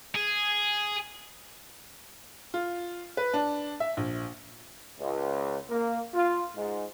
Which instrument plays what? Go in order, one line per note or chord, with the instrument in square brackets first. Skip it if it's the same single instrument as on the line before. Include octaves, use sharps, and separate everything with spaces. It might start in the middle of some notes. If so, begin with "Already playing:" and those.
[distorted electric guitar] G#4
[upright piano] F4
B4
D4
E5
A#1
[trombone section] C#2
A#3
F4
G#2